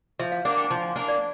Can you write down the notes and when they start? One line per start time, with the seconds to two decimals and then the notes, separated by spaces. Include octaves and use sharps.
0.19 F3 E5
0.32 F5
0.45 A#3 D4 F#5
0.58 G5
0.64 G#5
0.70 F3 A5
0.83 G#5
0.96 A#3 D4 G#5
1.08 D5